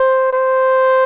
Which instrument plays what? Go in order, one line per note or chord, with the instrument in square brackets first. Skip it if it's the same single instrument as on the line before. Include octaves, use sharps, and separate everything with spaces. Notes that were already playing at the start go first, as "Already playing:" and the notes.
Already playing: [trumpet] C5
C5